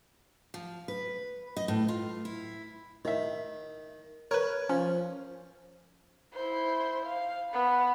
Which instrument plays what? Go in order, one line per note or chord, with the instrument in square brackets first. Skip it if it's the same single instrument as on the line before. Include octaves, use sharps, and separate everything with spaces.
[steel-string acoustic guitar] F3
B4
D#5
A2
F4
E4
[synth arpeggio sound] A2 E5 [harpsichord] D#3
[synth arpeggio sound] A#4 B4 [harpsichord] C#5
[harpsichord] F3 [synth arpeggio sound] C#4
[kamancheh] E4 C5
F5
B3 B5